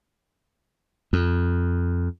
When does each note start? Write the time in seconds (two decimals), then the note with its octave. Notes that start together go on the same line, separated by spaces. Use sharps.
1.13 F2